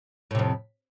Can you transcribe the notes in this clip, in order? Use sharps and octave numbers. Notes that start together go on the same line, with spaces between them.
F2 A2 C3